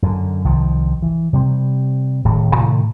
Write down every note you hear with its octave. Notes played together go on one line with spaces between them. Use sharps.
F#2 D3
C2 D#3 F3
E3
C3 G3 C4
D1 A2 D#3
A2 C3 D#3 A3